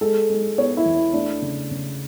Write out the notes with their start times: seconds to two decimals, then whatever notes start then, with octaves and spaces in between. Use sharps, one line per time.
0.01 G#3 A4
0.30 G#3
0.58 B3 C#5
0.77 E4
0.86 E2
1.14 A3 D4
1.42 C#3
1.71 C#3